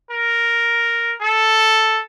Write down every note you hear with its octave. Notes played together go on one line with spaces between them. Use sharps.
A#4
A4